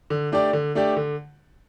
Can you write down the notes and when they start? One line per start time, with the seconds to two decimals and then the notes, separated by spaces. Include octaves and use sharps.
0.10 D3
0.32 A3 D4 G4 D5
0.53 D3
0.75 A3 D4 G4 D5
0.97 D3